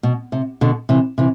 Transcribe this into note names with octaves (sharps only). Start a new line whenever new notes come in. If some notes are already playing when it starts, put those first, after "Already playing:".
B2
C3
B2 D3
C3 E3
C3 E3